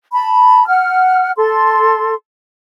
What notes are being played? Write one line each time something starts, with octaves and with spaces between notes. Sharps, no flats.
A5 B5
F#5 F6
A4 C6